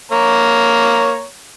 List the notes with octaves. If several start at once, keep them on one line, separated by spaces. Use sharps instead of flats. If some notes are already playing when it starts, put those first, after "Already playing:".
A#3 C#5 A#5